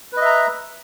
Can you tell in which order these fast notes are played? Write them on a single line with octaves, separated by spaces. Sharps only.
B4 D#5 E5 A#5